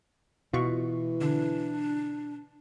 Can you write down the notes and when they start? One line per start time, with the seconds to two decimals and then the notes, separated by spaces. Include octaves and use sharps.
0.53 B2 E3 F4 F#4 C#6
1.21 D3 D4